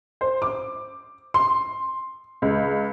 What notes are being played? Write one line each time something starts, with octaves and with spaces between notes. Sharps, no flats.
C5
D6
C6
C#2